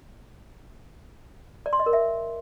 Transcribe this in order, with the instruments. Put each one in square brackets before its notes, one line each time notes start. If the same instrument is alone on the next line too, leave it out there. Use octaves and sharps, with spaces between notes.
[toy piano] D5
C6
D#5
A#4
E5